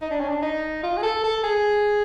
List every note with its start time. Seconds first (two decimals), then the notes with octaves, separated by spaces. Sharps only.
0.02 D#4
0.11 D4
0.20 C#4
0.29 D4
0.42 D#4
0.83 F4
0.97 G#4
1.03 A4
1.23 A4
1.43 G#4